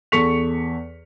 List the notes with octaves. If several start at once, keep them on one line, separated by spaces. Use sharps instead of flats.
E2 A4 C#6 B6 C#7 F7